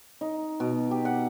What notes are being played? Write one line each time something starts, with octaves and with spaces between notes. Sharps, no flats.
D#4
B2
G4
F#5